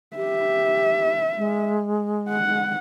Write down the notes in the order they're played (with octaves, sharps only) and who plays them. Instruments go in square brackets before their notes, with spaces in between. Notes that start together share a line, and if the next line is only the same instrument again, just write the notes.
[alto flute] G4 [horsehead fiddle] E5
[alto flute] G#3
[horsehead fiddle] F#5